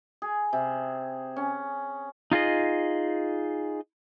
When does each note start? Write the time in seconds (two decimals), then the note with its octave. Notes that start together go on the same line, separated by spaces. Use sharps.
0.22 G#4
0.53 C3
1.36 C#4
2.31 D#4 F4 G#4 D#5